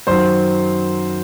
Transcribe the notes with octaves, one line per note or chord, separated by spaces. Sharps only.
F#2 D#3 F#3 C5 C6